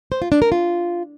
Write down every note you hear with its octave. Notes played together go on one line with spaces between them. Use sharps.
C5
F4
D4
A#4
F4